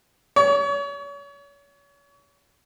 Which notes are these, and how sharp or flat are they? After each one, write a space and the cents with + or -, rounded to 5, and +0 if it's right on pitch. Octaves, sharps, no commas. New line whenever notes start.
C#5 +35